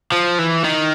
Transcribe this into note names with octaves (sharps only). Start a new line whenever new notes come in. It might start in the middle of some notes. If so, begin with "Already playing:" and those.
F3
E3
D#3